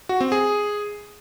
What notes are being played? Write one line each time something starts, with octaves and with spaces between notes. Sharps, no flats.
F#4
C4
G#4